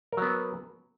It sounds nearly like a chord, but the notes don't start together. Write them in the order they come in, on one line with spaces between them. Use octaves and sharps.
A#4 F#3 B3